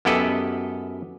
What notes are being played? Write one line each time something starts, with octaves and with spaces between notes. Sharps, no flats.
F#2 B3 E4 G4 A4 D#5